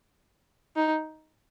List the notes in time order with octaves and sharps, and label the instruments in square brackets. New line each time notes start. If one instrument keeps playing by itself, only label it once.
[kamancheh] D#4